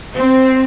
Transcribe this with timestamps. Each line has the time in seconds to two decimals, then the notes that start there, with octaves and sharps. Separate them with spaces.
0.16 C4